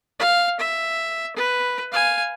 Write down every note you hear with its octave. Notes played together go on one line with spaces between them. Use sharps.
F5
E5
B4
F5 G#5